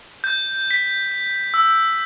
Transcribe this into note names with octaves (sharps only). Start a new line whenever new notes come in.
G6
B6
E6